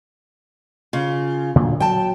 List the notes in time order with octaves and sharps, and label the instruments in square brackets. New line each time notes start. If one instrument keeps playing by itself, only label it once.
[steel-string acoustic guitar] C#3 F4
[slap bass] A#2 D3 F#3
[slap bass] F#3 [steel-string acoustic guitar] G5 A5